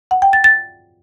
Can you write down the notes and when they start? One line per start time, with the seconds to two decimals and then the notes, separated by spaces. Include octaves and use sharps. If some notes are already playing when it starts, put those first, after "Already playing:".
0.11 F#5
0.22 G5
0.33 A6
0.44 A6